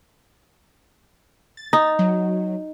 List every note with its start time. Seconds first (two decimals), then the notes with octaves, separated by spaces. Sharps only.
1.57 A6
1.73 D#4
1.99 F#3